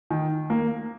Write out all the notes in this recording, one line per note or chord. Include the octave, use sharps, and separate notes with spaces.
D#3
A#3